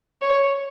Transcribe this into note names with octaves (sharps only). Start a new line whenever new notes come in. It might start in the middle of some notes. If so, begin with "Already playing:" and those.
C#5